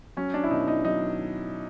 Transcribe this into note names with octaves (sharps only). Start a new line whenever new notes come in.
F#3 C#4
D4
E4
B2 D#4
D#4
F#3 D#4